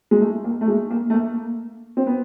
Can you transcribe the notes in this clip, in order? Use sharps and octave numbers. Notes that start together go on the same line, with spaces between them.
G#3
A3
A#3
A3
G#3
A#3
A3
A#3
C4
B3